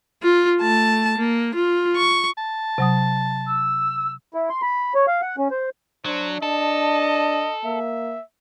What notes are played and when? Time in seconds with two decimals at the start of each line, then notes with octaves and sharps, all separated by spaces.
0.22 F4
0.61 A3 A5
1.17 A#3
1.55 F4
1.96 C#6
2.38 A5
2.78 C3 F#3 D#6
3.46 E6
4.34 E4
4.49 C6
4.62 B5
4.95 C#5
5.07 F5
5.22 F#5
5.38 C#4
5.51 C5
6.05 F#3 D4 C5
6.42 D4 A4 D#5
7.65 A#3 E5